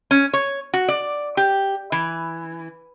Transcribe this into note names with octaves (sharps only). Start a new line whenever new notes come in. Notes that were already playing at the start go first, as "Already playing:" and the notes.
C#4
C#5
F#4
D5
G4
E3